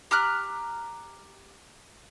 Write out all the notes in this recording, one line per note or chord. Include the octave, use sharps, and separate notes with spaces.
G4 A#5 F6 F#6